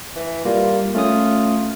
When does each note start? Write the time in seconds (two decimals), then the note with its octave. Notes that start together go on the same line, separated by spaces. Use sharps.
0.16 E3
0.45 G3 A#3 F4
0.95 A3 C#4 F4 D#6